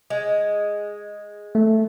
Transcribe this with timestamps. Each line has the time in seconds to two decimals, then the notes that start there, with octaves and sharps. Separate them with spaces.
0.10 G#3
1.55 A3